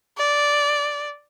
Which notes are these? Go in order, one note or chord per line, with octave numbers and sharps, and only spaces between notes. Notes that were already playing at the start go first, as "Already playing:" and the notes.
D5